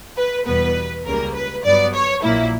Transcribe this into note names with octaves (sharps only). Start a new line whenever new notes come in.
B4
E2 B2 G3 B3 B4
C#2 C#3 G3 A#3 A#4
B4
G2 F#3 B3 D5
C#5
A#1 A#2 F#3 A#3 E4